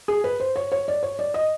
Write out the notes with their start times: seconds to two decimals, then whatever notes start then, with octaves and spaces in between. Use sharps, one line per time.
0.08 G#4
0.24 B4
0.40 C5
0.56 C#5
0.72 C#5
0.88 D5
1.03 C#5
1.19 D5
1.34 D#5